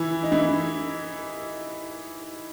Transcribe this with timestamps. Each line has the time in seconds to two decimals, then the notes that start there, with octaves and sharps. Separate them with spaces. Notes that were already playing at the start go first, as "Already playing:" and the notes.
Already playing: E3 E4
0.23 D#4
0.32 E3 E4